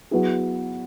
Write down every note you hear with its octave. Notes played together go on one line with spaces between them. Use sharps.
F#3 B3 E4 G#4